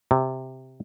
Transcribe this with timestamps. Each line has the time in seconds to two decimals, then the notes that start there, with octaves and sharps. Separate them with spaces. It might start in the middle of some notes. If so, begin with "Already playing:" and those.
0.11 C3